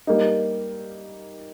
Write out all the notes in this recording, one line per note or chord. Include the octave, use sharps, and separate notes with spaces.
G3 A#3 D#4